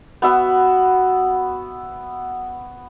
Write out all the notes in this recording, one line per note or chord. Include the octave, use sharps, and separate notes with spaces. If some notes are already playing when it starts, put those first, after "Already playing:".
B3 F#4 E5 B5